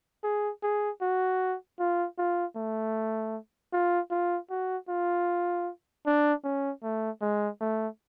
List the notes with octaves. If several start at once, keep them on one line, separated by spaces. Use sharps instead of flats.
G#4
G#4
F#4
F4
F4
A3
F4
F4
F#4
F4
D4
C#4
A3
G#3
A3